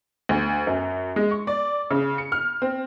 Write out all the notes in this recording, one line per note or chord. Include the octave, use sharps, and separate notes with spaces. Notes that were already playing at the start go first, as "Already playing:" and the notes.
D2
F#2
G#3
C#6
D5
C#3
C#7
F6
C4